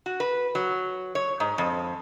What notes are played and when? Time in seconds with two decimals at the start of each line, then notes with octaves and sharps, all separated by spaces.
0.06 F#4
0.20 B4
0.55 F#3
1.15 C#5
1.40 G#2
1.58 F2